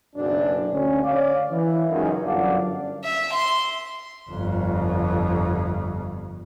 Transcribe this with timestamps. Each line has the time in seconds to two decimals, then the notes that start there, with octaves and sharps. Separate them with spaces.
0.16 F#1 B1 F#2 D4
0.71 D2 C#4
1.03 C#5 D5 F5
1.51 E3
1.89 C#2 F#2 D#3
2.23 G1 F#2 D4 D5 F5 F#5
3.04 E5
3.33 C6
4.30 G1 F2